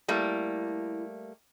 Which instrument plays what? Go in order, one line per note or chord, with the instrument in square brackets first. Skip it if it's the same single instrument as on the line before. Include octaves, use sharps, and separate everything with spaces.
[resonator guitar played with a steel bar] G3 A3 A#3 [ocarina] E4